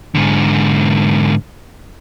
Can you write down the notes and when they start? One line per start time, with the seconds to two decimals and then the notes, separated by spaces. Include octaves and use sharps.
0.15 G#2 D3